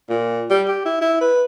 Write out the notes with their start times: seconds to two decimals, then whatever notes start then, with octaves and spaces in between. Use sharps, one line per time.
0.10 A#2
0.50 G3
0.68 G4
0.85 E4
1.01 E4
1.21 B4